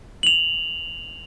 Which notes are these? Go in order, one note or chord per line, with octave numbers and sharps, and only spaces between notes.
F7 F#7